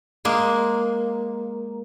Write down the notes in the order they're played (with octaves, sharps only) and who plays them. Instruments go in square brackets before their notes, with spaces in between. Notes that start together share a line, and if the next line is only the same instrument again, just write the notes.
[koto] G#3 A#3